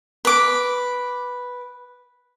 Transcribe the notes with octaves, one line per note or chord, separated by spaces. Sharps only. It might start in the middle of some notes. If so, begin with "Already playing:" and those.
B4 D6